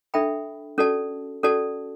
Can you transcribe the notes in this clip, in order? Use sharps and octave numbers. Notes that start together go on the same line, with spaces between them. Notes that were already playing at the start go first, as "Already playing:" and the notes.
D4 A4 E5 G5 B5
C#4 F#4 A4 D5 A5
C#4 F#4 A4 D5 A5